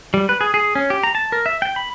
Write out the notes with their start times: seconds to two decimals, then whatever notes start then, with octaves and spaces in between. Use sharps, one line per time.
0.14 G3
0.29 B4
0.41 G#4
0.54 G#4
0.75 C#4
0.90 G4
1.03 A#5
1.15 A5
1.32 A#4
1.46 E5
1.62 G5
1.76 B5